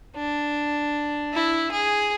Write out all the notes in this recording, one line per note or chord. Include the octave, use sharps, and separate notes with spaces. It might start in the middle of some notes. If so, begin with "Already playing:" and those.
D4
E4
G#4